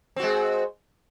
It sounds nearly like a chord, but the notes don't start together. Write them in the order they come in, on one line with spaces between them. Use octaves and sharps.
C4 F#4 G#3